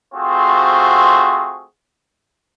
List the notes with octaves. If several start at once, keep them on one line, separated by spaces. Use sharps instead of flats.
A3 C4 F4 F#4 G#4 C5